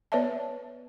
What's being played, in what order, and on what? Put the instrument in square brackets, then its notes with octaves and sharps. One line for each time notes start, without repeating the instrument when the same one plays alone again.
[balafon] B3 B4 C#5 D5 E5 A5